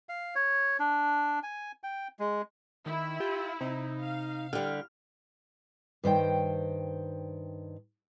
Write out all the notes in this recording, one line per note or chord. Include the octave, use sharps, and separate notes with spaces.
F5
C#5
D4
G#5
G5
G#3
D#3 E4
F4 G4
C3 D#4
F5
D3 G3 F6
G2 D#3 C5 G5